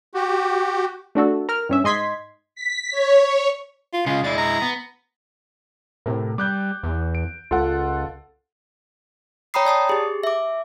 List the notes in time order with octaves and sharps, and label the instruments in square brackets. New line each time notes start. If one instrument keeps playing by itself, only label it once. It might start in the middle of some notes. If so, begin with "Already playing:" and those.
[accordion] F#4 G4
[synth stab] A3 D4 F#4 A4
A#4 F6
G2 C#4 E5
G#2 D#5 C6 G#6 B6
[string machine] B6
C#5
[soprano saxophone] F4
[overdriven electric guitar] C#3 G#3 [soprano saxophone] F4
[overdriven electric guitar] G#3 E4 [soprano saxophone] D5
[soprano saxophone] A#5
[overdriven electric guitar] B3
[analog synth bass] A2 [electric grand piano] C3 A#4
[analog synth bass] G3 [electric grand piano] D6 F#6 G6
[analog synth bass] E2
[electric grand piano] D7
[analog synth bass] C#2 [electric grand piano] F4 A4 F#5
[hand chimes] C#5 G5 A#5 B5 D#6 C7
D5 A5 D#6 C7
G4 G#4
E5 D6